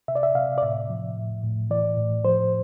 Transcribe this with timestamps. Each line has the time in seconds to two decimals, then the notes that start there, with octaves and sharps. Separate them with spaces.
0.08 C3 E5
0.15 D5
0.23 E5
0.35 C3 F5
0.58 D5
0.62 A2 E5
0.90 F3
1.17 A2
1.43 A2
1.70 E3 D5
1.98 A2
2.25 F3 C5